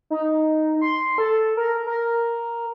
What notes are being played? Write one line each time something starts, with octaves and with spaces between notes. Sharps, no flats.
D#4
C6
A4
A#4
A#4